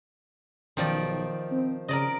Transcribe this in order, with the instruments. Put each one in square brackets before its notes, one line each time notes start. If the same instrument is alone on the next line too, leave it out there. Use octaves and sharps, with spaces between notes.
[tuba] B1 [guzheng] D#3 F3 D5
[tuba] C4
[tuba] C#3 [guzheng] A#4 D5 D#5